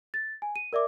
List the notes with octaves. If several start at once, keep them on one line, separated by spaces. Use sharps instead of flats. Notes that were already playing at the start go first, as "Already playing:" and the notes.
A6
G#5
D#7
A#4 D5 E5 D6